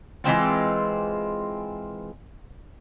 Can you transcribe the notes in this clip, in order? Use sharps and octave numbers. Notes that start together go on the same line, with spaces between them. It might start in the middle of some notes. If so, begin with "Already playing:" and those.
E3 G#3 C4 F4